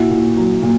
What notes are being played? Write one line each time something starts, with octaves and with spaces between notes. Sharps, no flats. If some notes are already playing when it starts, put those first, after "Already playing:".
Already playing: A#2 E4 F#4
A#2
F#3
A#2